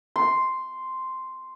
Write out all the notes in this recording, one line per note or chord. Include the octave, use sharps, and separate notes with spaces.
C6